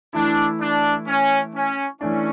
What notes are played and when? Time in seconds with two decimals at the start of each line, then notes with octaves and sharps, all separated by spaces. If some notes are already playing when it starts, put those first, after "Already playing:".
0.13 E3 A3 D4 E4
0.60 D4
1.06 C#4
1.53 C#4
2.01 E3 A3 C#4 D4